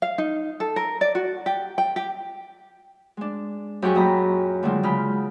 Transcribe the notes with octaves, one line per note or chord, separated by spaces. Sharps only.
F5
D#4
A4
A#4
D5
F#4
G4
G5
G4
G#3 D4
F#2 G4 G#4 G5 C#6
A#2 F#3 D#5 A#5 B5
A#2 D3 D#3 F#3 G#3 F4
C#3 G#3 B5 F6 G6